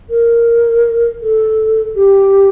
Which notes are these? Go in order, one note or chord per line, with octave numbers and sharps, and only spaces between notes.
A#4
A4
G4